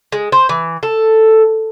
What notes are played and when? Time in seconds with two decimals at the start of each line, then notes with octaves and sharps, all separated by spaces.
0.12 G#3
0.32 C5
0.49 E3
0.83 A4